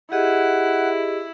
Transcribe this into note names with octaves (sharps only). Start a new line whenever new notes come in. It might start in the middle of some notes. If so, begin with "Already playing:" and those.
E4 G4 G#4 D#5 F#5